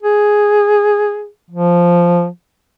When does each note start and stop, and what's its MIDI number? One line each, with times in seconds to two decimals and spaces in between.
0.03 1.28 68
1.50 2.27 53